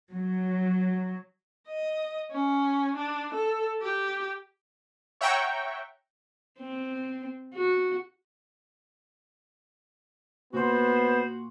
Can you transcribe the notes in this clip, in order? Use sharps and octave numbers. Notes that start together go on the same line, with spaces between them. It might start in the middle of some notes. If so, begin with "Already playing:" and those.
F#3
D#5
C#4
D4
A4
G4
C#5 E5 F#5 G5 A#5 C#6
C4
F#4
A#2 B3 F#4 C5 C6